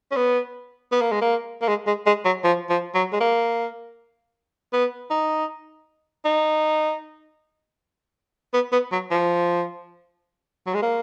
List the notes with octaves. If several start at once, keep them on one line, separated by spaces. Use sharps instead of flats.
C#4
B3
B3
A#3
G#3
A#3
A#3
G#3
G#3
G#3
F#3
F3
F3
F#3
G#3
A#3
B3
D#4
D#4
B3
B3
F#3
F3
F#3
G#3
A#3